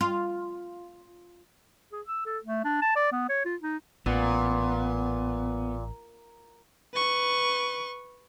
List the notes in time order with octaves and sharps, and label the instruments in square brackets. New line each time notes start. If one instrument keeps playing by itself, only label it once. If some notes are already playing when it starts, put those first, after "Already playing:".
[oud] F4
[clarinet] G#4
E6
A4
A3
D4
A5
D5
B3
C#5
F4
D#4
[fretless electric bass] A1 [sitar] A#2 [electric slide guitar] B3
[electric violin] B4 C#6